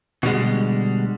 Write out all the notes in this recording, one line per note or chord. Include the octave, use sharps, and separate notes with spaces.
B2 D3 G3 G#3